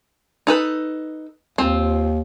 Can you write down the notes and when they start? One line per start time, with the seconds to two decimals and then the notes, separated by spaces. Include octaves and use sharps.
0.47 D#4 A4 B4
1.58 D#2 C4 F4